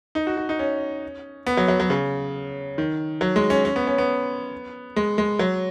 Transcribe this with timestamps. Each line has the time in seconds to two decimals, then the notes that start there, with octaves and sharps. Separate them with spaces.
0.15 D#4
0.27 F#4
0.37 F#4
0.49 D#4
0.59 C#4
1.47 B3
1.57 F#3
1.68 F#3
1.80 F#3
1.90 C#3
2.78 D#3
3.21 F#3
3.36 G#3
3.50 C#4
3.65 C#4
3.76 B3
3.87 C#4
3.98 B3
4.96 G#3
5.18 G#3
5.39 F#3